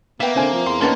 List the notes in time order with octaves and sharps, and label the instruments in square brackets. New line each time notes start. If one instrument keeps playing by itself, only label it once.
[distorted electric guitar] A#3 [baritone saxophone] B3 [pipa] E5 G5
[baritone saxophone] D3 [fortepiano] C4 G#5
[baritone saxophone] F3
[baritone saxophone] E2 [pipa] C6
[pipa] D#3 A5 C6 [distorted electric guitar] A#3 [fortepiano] B3 C#4